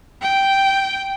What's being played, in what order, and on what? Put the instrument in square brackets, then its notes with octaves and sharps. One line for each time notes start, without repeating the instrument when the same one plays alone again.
[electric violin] G5